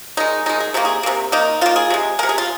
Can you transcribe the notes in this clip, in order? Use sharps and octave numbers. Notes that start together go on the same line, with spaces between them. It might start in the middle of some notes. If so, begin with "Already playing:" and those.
D#3 G#3 D#4
D#3 G#3 D#4
G#4
C3 D#3 A#3 D#4
G#4
C3 D#3 A#3
D#3 A#3 D#4
D#3 A#3 F4
G#4
C3 G#3
C3 G#3 A#4
G#4
F4